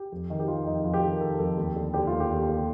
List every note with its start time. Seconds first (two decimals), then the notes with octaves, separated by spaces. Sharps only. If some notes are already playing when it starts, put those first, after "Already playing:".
Already playing: G4
0.12 F2
0.30 D#3
0.39 G4
0.48 D#3 F4
0.66 F2 D#4
0.84 F2 F4
0.94 G4
1.02 D#3 A4
1.12 A#4
1.20 D#3 A4
1.38 F2 A4
1.57 D#2
1.76 D3
1.94 D3 G4
2.07 D#2 F4
2.20 G4
2.30 D#2
2.49 D3